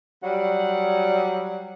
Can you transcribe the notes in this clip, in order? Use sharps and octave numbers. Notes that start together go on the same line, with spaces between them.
F#3 G3 F#5